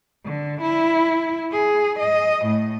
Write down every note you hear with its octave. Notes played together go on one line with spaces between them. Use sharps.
D3
E4
G#4
D#5
A2